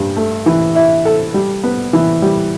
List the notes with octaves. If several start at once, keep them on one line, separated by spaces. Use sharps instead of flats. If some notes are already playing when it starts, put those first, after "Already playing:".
Already playing: G2
A3
E3
E4
A4
G3
B3
E3
G3